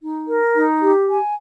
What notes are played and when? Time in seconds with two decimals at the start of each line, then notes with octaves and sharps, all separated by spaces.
0.01 D#4
0.28 A#4
0.55 D#4
0.81 G4
1.08 G#5